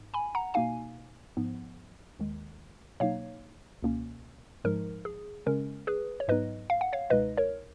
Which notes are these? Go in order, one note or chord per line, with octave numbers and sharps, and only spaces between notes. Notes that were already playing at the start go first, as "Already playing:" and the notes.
Already playing: G#2
G#5 B5
F#5 A#5
B2 A#3 D#4 F5 G#5
G#2 F3 B3
D#2 D#3 G#3
B2 F#3 A#3 D#4 C#5 F5
C#2 B2 A#3 C#4
G#2 F3 G#3 D#4 A#4
G#4
C#3 G#3 C#4 A#4
G#4 B4
C#5
G#2 F#3 B3 D#4 B4 D#5
F5
F#5
C#5 F5
C#2 B2 G#3 D#4 B4 D#5
A#4 C#5